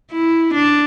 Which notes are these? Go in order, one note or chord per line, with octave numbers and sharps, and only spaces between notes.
E4
D4